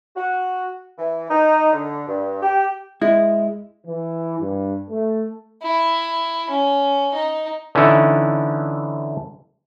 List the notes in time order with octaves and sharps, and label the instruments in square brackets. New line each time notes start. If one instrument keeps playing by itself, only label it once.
[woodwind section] F#4
E3
D#4
D3
G2
G4
[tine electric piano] G#3 [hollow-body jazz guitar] E4
[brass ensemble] E3
G2
A3
[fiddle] E4
C#4
D#4
[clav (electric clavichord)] D3 E3 C#4 D#4 E4 A4